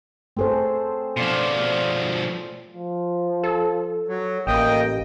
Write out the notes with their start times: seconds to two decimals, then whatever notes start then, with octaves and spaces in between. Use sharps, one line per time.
0.37 A3 C4 G#4 A4 C5 C#5
1.17 B2 F3 F4 D5
2.74 F3
3.43 A4
4.08 F#3
4.47 A1 A#3 D#5 G5